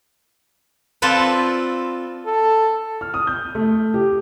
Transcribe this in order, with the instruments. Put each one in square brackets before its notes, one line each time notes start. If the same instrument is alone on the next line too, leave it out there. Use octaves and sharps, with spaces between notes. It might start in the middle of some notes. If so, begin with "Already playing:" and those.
[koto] C4 F4 A4 B4 D5
[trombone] A4
[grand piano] F6
D#6
G6
A3
G4